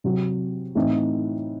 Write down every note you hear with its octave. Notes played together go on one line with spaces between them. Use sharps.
C3 F#3 C4 F#4
A2 E3 C4 D#4